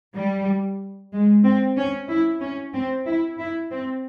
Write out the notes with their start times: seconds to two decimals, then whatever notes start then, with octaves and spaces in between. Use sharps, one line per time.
0.16 G3
1.12 G#3
1.44 C4
1.77 C#4
2.09 E4
2.41 C#4
2.74 C4
3.06 E4
3.38 E4
3.71 C4